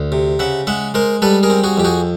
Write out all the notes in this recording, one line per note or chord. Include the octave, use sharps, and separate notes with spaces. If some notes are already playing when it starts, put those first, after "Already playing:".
Already playing: D2
C3
C#3 E5 F#5
G#3 E5 F#5
G#3 A#4 C5
G3 A4 B4
G#4 A#4
C4
F#4 G#4
F2 G4
F#4 G#4